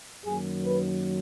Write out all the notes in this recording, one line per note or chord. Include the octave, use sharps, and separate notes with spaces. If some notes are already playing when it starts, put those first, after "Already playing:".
F#2 D#3 F#3 A#3 G#4
B4